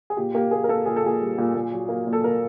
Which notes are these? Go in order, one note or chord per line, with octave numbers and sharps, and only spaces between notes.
G#4
A#2 G4
A#3 G4
A#3 G#4
A#4
A#3 A4
A#2 G#4
A4
A#2 G#4
G3
A#2
A#2
F#3
A#3
A#2
A4
A#3 A#4